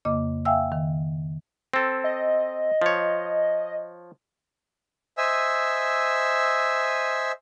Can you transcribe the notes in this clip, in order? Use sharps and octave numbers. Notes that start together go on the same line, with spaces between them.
F2 C#3 A#3 D#5 D6
E5 F5 G5 G#5 E6
D#3
C4 A4
D#5
F3 C#5
C5 D#5 E5 G#5 E6